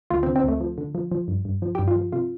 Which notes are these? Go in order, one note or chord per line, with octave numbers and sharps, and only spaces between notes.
D2 F4
C4
D3
C4
D2 A3
F3
D3
F3
F3
G2
G2
F3
G4
G2
F4
F3
C3 F4